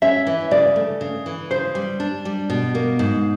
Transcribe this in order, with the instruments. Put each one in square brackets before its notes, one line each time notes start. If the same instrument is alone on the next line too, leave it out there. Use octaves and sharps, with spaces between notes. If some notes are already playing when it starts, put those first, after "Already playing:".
[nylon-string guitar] C#4 [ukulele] E5
[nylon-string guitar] E3
[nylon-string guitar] C#3 [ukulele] D5
[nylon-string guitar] A3
C#3
E3
[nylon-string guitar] C#3 [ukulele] C5
[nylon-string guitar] G3
D4
G3
B2
A#3
G#2